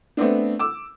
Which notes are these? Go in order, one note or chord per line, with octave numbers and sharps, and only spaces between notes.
A3 B3 C4 D4
D6 E6